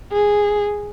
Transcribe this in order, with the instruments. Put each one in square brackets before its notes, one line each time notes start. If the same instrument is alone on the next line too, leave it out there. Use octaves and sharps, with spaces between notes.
[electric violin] G#4